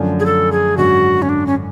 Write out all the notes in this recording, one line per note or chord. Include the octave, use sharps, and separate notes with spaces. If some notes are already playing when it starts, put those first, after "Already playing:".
Already playing: F#2 D3 F3 A3 D4
G#4
A4
G#4
G#1 F#2 D3 F#4
C#4
D4
C#4